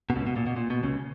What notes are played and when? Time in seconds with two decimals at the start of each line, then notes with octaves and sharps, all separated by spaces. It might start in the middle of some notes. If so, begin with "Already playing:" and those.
0.10 B2
0.15 C#2 C#3
0.27 B2
0.36 A#2
0.47 B2
0.56 A#2
0.70 B2
0.83 C#2 C#3